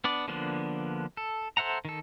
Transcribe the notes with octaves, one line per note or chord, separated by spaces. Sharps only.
B3 D4 D5
D3 F3 A#3 B3 D4
A4
A4 C5 E5 F#5 A#5
D#3 A4